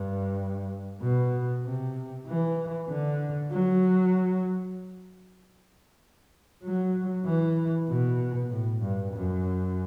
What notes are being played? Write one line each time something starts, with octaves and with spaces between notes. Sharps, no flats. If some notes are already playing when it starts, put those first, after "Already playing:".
Already playing: G2
B2
C3
E3
D3
F#3
F#3
E3
B2
A2
G2
F#2